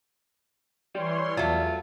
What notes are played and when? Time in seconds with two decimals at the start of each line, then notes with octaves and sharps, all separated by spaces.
0.95 E3 G3 G4 C#5 D5 C6
1.37 E2 F#3 A3 F4